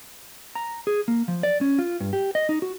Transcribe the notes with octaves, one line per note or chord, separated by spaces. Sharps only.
A#5
G#4
A#3
F3
D5
C#4
F4
G2
G4
D#5
D#4
F#4